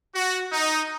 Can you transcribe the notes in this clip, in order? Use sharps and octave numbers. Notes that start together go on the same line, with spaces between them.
F#4
D#4